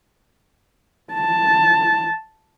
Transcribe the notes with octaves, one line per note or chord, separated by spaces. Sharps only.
A5